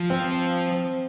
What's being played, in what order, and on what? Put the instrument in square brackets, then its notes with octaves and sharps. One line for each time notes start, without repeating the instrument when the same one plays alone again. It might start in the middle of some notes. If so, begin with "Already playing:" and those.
Already playing: [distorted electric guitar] F3
[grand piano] C4